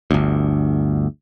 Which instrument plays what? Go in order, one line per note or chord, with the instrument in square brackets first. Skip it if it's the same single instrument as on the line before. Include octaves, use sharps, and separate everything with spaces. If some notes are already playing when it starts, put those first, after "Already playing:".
[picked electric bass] G1 D2